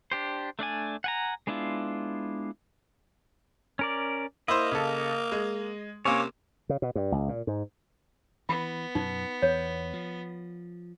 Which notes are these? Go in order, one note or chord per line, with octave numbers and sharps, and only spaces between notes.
D4 G4 C5
A3 D4 D5 G#5
F#5 G#5 A#5
G#3 B3 D4 E4 F4
C#4 A#4 D5
A#3 E4 C5 D#5
C#3 A4
G#3
C3 A#3 C#4 C#5 G#5
C#3
B2
G2
C#2
A#2
G#2
E3 B3 B5
F#2 B2 D#4
E2 C#5
F3